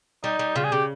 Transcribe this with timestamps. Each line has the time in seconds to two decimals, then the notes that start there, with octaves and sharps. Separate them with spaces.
0.24 G3 D#4
0.39 G3
0.56 C#3 F4
0.64 G#4
0.72 C#3 G4